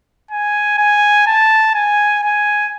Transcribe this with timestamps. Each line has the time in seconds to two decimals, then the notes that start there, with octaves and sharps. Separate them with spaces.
0.31 G#5
0.78 G#5
1.27 A5
1.75 G#5
2.23 G#5